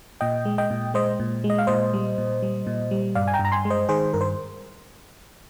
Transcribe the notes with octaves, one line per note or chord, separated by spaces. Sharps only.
A#2 D#5 G5
G#3
D#5 G5
A#2
G#3 C5 D#5
A#2
G#3
D#5
F5
A#2 C5 D#5
G3
A#2
G3
A#2
G3
G2 D5 F5
G#5
G5 A#5
G2
A#5
G#5 C6
G#3
C5 D#5
D#3 G#4 C5
G2 A#4
C5